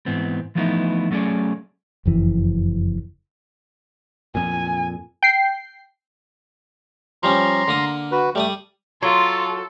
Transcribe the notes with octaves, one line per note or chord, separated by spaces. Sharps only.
G#2 E3 B3 C4
E3 F3 A3 B3 D#4 E4
F#3 A3 C#4 G#4 D5
F#1 F2 E3
F2 A#2 G#5
G5 C7
F3 G3 C#4 A#5 C6
D3 A#3 D#6
F#4 B4
G3 A3 D5 D#6
F#3 F4 A4 C6